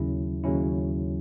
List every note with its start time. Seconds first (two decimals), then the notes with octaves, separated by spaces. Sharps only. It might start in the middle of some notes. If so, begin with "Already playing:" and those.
Already playing: D#2 C#3 F#3 C#4 E4
0.44 D#2 C#3 F#3 C#4 E4